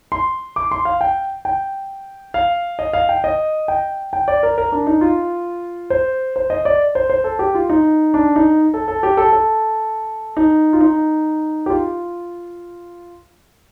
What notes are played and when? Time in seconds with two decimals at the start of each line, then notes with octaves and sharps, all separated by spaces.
0.12 C6
0.56 D6
0.71 C6
0.85 F5
1.01 G5
1.45 G5
2.34 F5
2.79 D#5
2.93 F5
3.09 G5
3.24 D#5
3.68 G5
4.13 G5
4.28 D5
4.43 A#4
4.58 A#4
4.72 D4
4.87 D#4
5.01 F4
5.90 C5
6.36 C5
6.50 D#5
6.65 D5
6.95 C5
7.10 C5
7.24 A4
7.39 G4
7.55 F4
7.70 D#4
8.14 D4
8.36 D#4
8.74 A4
8.88 A4
9.03 G4
9.17 A4
9.32 A4
10.37 D#4
10.73 F4
10.81 D#4
11.66 G4
11.70 F4